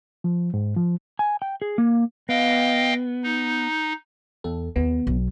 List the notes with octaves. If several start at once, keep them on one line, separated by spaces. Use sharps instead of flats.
F3
G#2
F3
G#5
G5
G#4
A#3
B3 D#5 F5 G5
D#4
E2 A4
D#2 B3
B1